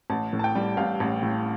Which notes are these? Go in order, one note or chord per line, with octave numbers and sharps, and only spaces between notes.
A1 A5
A2
A5
G5
G3
A1 F5
A1
A2